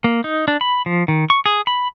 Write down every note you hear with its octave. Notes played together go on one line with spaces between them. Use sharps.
A#3
D#4
D4
B5
F3
D#3
C#6
G#4
B5